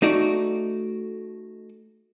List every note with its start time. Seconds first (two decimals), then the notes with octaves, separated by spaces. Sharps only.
0.02 A3 D#4 F#4 D5